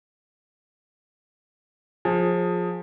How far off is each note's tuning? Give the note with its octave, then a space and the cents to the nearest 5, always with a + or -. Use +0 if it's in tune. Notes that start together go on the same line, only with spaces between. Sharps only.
F3 +25 G#4 +0